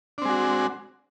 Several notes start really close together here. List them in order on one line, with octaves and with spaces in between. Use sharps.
D4 C4 G#3 F#4